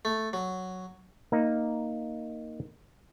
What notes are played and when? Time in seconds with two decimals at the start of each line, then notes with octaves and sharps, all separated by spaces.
0.05 A3
0.33 F#3
1.32 A#3 D#4